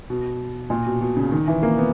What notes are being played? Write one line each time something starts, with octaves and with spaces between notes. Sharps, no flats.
B2
A#2
B2
B2
C#3
D#3
E3
A#3
B3